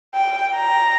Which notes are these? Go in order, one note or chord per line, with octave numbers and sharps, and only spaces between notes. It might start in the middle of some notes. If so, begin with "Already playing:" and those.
G5
A#5